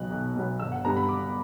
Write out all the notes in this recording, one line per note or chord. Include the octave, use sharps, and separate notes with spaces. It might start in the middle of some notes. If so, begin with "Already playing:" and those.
Already playing: B1 B2 F#3 B3 F#6
B1
B2 F#3 B3
G1 E6
F#5
G2 D3 G3 B3 A#5
B5
G1 D6